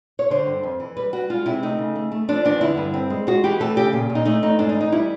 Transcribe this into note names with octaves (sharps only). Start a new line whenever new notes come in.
C#5
D3 C5
G2
F2
E3
G3 B4
G3 F#4
G#3 F4
C3 E4
A3 D#4
C#3
A3
A3
F3 D4
E2 D4
D3 E4
G2
C4
G#3
G#3 F#4
E3 G4
A3 A4
C#3 G4
A#2
A#2
D#4
A3 D#4
E2 D#4
G#2 D4
D#4
E3
D#4
G3 E4